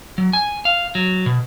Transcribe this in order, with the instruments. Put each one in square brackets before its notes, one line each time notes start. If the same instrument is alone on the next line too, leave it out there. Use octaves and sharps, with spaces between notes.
[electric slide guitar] F#3
G#5
F5
F#3
B2